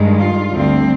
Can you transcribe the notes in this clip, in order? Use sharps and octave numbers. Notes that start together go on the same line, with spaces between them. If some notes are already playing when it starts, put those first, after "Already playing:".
Already playing: G2 D#3 G#3
F4
D2 D3 G3 C4